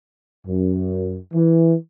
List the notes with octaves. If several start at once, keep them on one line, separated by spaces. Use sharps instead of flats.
F#2
E3